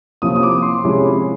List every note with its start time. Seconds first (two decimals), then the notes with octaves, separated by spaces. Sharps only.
0.22 C3 F3 A#3 C#4 E4 D#6
0.36 D#6
0.43 D6
0.62 C6
0.84 C3 F3 G#3 C#4 E4